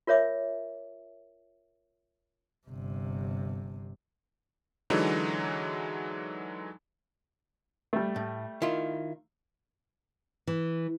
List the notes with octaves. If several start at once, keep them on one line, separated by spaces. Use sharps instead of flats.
F4 A#4 C#5 E5 D6
G1 C3
D3 E3 F#3 G#3 D#4
G3 A3
A2
D#3 E4 F4
E3